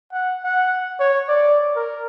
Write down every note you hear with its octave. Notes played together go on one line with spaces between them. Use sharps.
F#5
F#5
C#5
D5
A#4